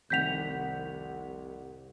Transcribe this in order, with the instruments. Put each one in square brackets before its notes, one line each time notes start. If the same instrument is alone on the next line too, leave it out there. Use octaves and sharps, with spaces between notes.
[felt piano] F1 D#3 F#5 [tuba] C2 [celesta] G6 B6 F7